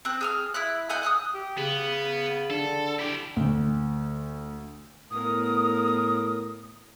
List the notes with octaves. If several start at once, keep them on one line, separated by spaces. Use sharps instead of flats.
C4 E6 F#6
G#4 E6 F6
E4 B5 F#6
D#5 F#5 G#5 G6
D#6 E6 F#6
G4
C#3 B3
D3 A4
E4 G4
D2
A2 B3 A#4 D#6